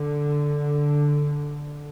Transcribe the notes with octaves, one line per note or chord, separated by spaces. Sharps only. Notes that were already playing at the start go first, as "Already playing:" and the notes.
Already playing: D3